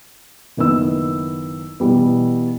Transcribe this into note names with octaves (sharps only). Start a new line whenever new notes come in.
F#1 D#3 B3 E4 E6
B2 E3 G3 B3